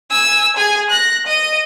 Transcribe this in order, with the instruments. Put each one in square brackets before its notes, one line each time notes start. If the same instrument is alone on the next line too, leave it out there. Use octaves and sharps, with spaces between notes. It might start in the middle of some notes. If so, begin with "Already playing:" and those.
[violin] G#5 E6
G#4 G#5
F#6 A#6
D#5 D#7